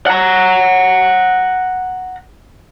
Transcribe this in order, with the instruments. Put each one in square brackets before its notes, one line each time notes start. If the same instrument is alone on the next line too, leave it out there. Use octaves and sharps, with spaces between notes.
[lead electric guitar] F#5 A#5